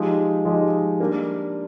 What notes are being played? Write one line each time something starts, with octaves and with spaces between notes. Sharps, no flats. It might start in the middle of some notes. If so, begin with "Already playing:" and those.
Already playing: F3 G#3 D#4 G4
F3 G#3 D#4 G4
G3 A#3 D4